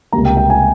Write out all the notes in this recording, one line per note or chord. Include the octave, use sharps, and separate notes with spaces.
C#2 C3 G3 A#3 A#5
G5
G5
G#5